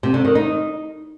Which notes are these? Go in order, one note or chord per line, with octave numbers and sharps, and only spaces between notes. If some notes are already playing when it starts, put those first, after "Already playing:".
C3
D3
D#3
D#4